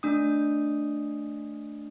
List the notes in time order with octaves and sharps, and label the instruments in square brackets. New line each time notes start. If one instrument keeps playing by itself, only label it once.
[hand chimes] A3 D4 D#6